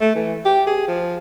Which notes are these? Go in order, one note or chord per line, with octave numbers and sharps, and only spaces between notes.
A3
E3
G4
G#4
F3